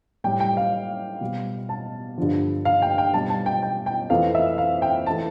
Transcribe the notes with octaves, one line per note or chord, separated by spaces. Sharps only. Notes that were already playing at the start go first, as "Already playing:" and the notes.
A2 G3 G5
G5
F5
B2 G3
A5
G2 D3 F3
F5
G5
G5
B2 G3 A5
A5
G5
G5
G5
F2 E3 A3 F5
E5
F5
G5
E3 A3 A5